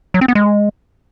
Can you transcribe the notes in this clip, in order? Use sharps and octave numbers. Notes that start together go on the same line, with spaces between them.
F#3
C4
B3
G#3